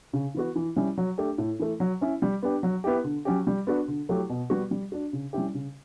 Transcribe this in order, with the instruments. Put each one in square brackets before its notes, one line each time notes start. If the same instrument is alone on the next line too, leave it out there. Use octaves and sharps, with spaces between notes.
[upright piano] C#3
E3 B3 F#4
E3
G3 C#4 E4
F#3
A3 D4 G4
A2
E3 A3
F#3
C#4 E4
G3
B3 D4 G4
F#3
B3 E4 G4
D3
F#3 C#4 G4
G3
B3 D4 F#4
D3
F#3 A3 E4 G4
B2
G3 B3 F#4
G3
D4 F#4
C#3
G3 C#4 E4 G4
C#3